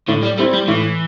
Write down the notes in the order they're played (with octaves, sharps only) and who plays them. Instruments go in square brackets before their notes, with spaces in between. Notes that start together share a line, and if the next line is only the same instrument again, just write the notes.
[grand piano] A2 [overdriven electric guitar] D3
[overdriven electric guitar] G3
[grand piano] G3 C4 E4 [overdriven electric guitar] A3
[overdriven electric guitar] G3
[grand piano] A2 [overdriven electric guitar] E3